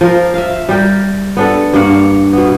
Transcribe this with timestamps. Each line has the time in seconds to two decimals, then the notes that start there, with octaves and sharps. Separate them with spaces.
0.01 F3 A#4
0.34 E5 F5
0.69 G3 G4 A#4
1.37 B3 D4 A4
1.73 G2 A#3 F5 F#5
2.33 B2 B3